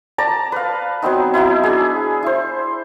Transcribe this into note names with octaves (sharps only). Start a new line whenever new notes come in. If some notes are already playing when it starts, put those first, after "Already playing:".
D5 A5 A#5
B4 F5
F#3 B3 C4 D#4
F#3 B3 D#4 E4
D4 G#4
E4 C5